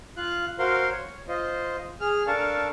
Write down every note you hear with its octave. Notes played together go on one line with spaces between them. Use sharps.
F4 F5 F#6
F#4 A#4 C5 F5 C6
C#5
F4 C5 D#5
G#4 F6
D4 A4 A#4 F5 A5 C#6